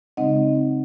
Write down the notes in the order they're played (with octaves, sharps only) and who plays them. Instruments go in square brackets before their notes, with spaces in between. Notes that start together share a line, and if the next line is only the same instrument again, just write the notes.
[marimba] C#3 G#3 C4 D#4 D#5 F#5